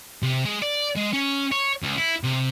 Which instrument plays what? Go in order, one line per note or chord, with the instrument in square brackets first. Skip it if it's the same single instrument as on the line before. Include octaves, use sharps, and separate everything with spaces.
[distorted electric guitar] C3
G#3
D5
G#3
C#4
C#5
C#2
E4
C3